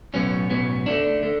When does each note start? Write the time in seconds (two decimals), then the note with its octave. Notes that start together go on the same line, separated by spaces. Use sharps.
0.13 B1 A2 F#3 B3 C#4
0.50 B1 A2 F#3 B3
0.86 D2 D3 A3 D4
1.23 D3 A3